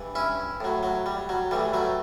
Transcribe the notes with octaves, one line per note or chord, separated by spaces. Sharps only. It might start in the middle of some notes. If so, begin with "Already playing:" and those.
Already playing: G2 E3
C#4 E4
A2 F#3
F#3
G3
F#3
A2 E3 G3
F#3 A3